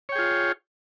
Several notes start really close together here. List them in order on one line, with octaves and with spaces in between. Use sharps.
C#5 G5 G#4 F4